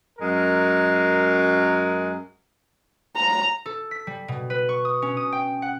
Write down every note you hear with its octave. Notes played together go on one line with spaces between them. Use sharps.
F#2 G#3 A#4
A#5
A4
B6
G3
B2
B4
C#6
D#6
C#4
D#6
G5
F#5